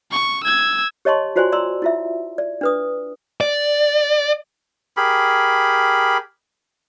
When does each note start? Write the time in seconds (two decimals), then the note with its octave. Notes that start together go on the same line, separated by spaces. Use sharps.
0.11 C#6
0.44 E6 G#6
1.05 G4 C#5 D#5 A5 C6 C#6
1.36 F4 F#4 C5 D5 G#5 C6
1.52 D5 A#5 C6 E6
1.82 E4 F4 E5
2.38 D5
2.61 D4 B4 D#6
3.41 D5
4.97 G4 G#4 A#4 B5